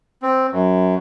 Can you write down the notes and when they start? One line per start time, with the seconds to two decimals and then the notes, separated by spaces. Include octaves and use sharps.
0.23 C4
0.52 F#2